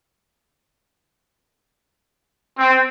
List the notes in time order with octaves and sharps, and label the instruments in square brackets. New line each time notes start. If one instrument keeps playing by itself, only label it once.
[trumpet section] C4